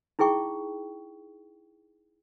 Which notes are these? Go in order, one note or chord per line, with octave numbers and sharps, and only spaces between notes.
D#4 E4 G#4 G5 C#6